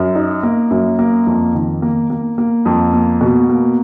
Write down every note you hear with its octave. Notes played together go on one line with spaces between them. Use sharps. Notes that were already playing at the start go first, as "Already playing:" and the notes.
Already playing: F#2
D#4
A#3
F#2
A#3
F2
D#3
A#3
A#3
A#3
F2
A#3
B2
A#3